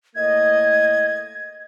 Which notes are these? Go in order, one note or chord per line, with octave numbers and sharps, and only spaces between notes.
A2 A#3 D#5 G#6